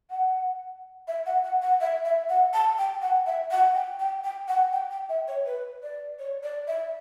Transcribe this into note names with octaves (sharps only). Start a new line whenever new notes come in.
F#5
E5
F#5
F#5
F#5
E5
E5
F#5
A5
G5
F#5
E5
F#5
G5
G5
G5
F#5
G5
G5
E5
C#5
B4
D5
C#5
D5
E5